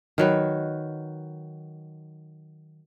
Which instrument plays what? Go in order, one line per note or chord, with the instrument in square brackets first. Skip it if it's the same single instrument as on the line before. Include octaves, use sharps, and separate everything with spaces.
[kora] D#3 F#3 B4